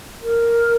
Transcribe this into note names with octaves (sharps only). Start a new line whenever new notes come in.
A#4